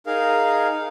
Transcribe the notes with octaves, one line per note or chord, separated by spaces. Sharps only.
D#4 G#4 A#4 F5